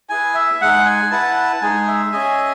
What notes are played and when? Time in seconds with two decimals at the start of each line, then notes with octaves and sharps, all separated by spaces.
0.09 E4 G#4 B4 G#5
0.35 E5
0.61 G#3 D#4 G#4 F#5
0.86 G#5
1.11 E4 B4 F#5 A5
1.36 A5
1.61 G#3 D#4 G#4 G#5
1.88 E5
2.12 C#4 G#4 D#5 G#5